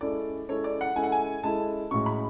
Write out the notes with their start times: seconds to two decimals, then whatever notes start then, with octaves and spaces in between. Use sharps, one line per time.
0.01 G#3 C#4 E4 A4 D5
0.49 G#3 C#4 E4 A4 C#5
0.64 D5
0.81 F#5
0.95 G#3 C#4 E4 A4 G#5
1.03 F#5
1.12 G#5
1.43 G#3 C#4 E4 A4 A5
1.91 A2 G#3 C#4 F#4 C#6
2.06 B5